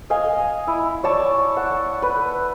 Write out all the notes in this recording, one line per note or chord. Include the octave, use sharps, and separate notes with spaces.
D#5 F5 G#5
E4
C#5 D5 A5 C#6
F#5
B4